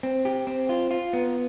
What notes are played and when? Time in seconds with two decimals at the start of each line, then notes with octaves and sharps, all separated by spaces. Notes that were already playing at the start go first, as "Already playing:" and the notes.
0.03 C4
0.25 G4
0.47 C4
0.69 F4
0.91 F4
1.13 B3